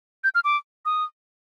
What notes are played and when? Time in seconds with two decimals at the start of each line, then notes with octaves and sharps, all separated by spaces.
0.24 G6
0.35 F6
0.44 D6
0.85 D#6